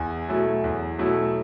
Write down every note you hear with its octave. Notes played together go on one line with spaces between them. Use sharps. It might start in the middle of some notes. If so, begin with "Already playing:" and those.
Already playing: E2 G#5
B2 F#3 A3 E4
E2
B2 F#3 A3 E4